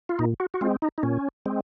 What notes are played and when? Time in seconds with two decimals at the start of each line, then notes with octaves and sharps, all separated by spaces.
0.09 F4
0.19 A#2 D#4
0.40 F#4
0.54 F#4
0.61 G#3 C4 F4
0.82 D#4
0.98 D#4
1.03 A#2 C#4
1.46 G#3 C4